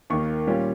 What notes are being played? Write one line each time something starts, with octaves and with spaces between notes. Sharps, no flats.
D#2 D#3 A#3 C#6
A#2 G3 C#4 F4